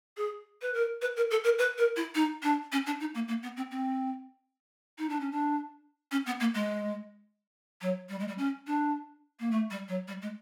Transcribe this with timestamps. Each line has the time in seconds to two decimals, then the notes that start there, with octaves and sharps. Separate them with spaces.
0.17 G#4
0.62 B4
0.74 A#4
1.01 B4
1.16 A#4
1.31 A4
1.44 A#4
1.59 B4
1.78 A#4
1.96 E4
2.15 D#4
2.43 D4
2.72 C#4
2.86 D4
3.00 D#4
3.15 A#3
3.28 A#3
3.43 B3
3.57 C4
3.71 C4
4.98 D#4
5.09 D4
5.20 C#4
5.31 D4
6.11 C#4
6.26 B3
6.40 A#3
6.54 G#3
7.81 F#3
8.09 G3
8.19 G#3
8.28 G3
8.38 C#4
8.67 D4
9.40 A#3
9.51 A3
9.70 G3
9.88 F#3
10.08 G3
10.22 G#3